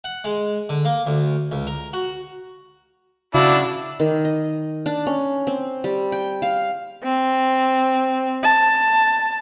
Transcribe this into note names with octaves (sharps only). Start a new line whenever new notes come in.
F#5
G#3
D3
A#3
D2
C#2
A#4
F#4
C#3 D4 E4 F#4 F5
D#3
D#5
D4
C#4
C4
G3
G5
F5
C4
A5